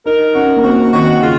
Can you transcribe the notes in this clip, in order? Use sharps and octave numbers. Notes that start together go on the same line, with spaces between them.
D#4 A#4
C#4 F#4
A#3
C4 F#4
D#3 F#4
C#3 F4